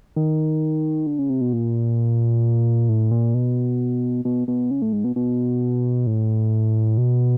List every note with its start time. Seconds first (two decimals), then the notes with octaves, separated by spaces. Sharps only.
0.16 D#3
1.07 D3
1.19 C#3
1.30 C3
1.41 B2
1.53 A#2
2.89 A2
3.11 A#2
3.34 B2
4.25 B2
4.48 B2
4.71 C#3
4.82 A2
4.93 G#2
5.04 B2
5.16 B2
6.07 A2
6.98 B2